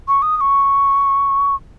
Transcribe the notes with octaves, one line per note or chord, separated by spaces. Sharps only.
C#6
D#6
D#6
C#6